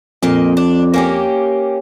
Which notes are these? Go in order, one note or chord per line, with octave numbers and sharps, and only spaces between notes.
F2 A#2 A#3 D#5
D4
A#3 C#4 G4